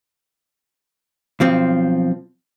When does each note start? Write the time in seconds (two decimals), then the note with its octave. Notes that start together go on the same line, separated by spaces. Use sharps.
1.40 B1 F3 C4